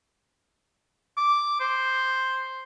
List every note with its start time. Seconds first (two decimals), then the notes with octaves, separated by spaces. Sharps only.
1.17 D6
1.60 C5